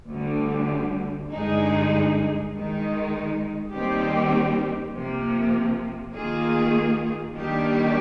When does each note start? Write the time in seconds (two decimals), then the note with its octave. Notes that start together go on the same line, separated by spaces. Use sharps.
0.12 D2 D3 G3
1.32 G2 D3 G#3 D#4 G#4
2.53 D#3 G#3 D#4
3.73 D#2 D#3 G3 C4 G4
4.93 C3 F3 A#3
6.13 D#3 A#3 F4 G#4
7.34 D#3 G3 A#3 D4 G4